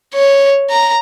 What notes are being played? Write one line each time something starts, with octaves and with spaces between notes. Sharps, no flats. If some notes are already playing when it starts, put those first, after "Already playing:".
C#5
A#5